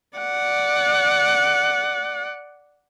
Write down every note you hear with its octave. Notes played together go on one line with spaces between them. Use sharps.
D5 F#5